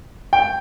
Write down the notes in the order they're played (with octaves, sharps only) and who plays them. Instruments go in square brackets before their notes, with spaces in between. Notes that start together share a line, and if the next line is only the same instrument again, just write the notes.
[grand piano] G5